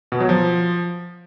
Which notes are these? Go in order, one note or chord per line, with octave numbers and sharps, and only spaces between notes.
B2
F#3
F3